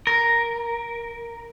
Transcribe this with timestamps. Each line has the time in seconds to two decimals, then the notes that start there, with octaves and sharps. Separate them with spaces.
0.07 A#4